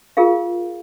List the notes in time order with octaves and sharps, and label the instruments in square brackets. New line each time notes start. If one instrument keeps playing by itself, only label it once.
[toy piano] F4 G#4 A#4 F5